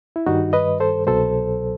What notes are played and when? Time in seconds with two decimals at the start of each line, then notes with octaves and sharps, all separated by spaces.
0.16 E4
0.26 G2 D#3 G3 D#4 F#4
0.53 B4 D#5
0.80 A4 C5
1.07 C2 B2 F#3 A4 C5